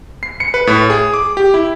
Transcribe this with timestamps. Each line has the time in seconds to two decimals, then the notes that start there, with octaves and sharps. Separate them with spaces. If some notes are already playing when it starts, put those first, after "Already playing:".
0.23 C7
0.40 C#7
0.54 B4
0.67 A2
0.90 G#4
1.14 D6
1.37 G4
1.54 E4